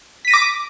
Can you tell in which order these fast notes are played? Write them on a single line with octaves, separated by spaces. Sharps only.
B6 D#7 A#6 D6